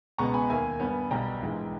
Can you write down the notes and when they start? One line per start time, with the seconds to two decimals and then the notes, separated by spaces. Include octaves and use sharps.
0.18 C#2 B2 G#3 B3 A#5 C#6
0.34 G#5 B5
0.49 D#2 D#3 A#3 E5 G#5
0.80 G2 G3 B3
1.11 B1 B2 G3 G5 A#5
1.41 A#1 G#2 E3 G#3